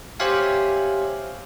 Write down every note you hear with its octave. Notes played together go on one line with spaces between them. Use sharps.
G4 C5 C#5 E5 F5 G#5